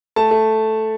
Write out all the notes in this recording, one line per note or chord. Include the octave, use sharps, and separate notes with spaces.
A3 A5
A3